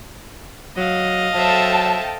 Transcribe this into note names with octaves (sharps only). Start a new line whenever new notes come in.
F#3 D#5 F5
F#3 A4 C5 E5 G5 A5